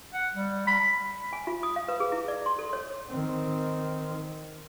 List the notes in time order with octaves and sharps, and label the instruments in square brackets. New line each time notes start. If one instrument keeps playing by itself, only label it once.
[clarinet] F#5
G3
B5
[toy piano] G#5
F4
D#6
F5
B4
G#4
E4
D5
C6
A4
C#5
[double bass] D#3 C4